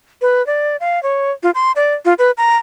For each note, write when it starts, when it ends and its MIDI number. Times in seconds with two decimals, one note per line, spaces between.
0.22 0.45 71
0.47 0.76 74
0.80 1.02 77
1.03 1.32 73
1.43 1.51 65
1.55 1.72 84
1.76 1.94 74
2.05 2.14 65
2.19 2.31 71
2.37 2.57 82